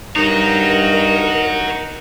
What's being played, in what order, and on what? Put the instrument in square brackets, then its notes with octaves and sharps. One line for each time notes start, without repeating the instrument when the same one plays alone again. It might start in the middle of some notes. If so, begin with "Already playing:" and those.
[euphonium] G2 [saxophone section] D#4 [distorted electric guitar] F#4 C#5 [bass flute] A#4